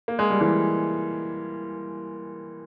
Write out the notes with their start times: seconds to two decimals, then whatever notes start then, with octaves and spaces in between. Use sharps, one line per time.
0.08 A#3
0.19 G#3
0.30 G3
0.41 E3 G#3